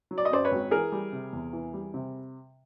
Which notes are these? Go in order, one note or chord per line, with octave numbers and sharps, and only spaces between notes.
F#3
D5
D#5
F#2 C5 D5
B4 C#5
G#1
E3 G#4 A#4
G3
C3
E2
E3
G3
C3